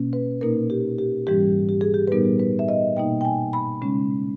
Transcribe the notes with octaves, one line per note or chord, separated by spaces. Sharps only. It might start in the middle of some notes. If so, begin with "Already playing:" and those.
Already playing: B2 A#3 C#4
B4
A#2 A#3 D#4 A#4
G4
G4
G#2 E3 G3 C#4 G4
G4
G#4
G4
B4
A#2 G3 B3 D#4 A#4
B4
E5
D#5
B2 A#3 D#4 G5
G5
G#5
B5
C#3 G#3 C#4